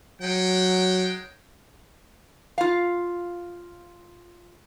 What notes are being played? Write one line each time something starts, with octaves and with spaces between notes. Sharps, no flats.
F#3 G#3 F#5 G5
F4 F5